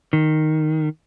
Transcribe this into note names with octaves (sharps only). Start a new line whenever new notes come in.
D#3